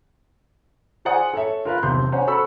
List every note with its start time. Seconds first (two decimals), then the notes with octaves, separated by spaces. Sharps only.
1.05 G#4 C5 D5 F#5 G#5 D#6
1.33 A4 C#5 E5
1.65 F4 A#4 B4 F5
1.83 E1 B1 C3 C6 G6
2.12 C#4 D4 C5 F#5
2.27 F#4 A4 C5 B5 C#6 E6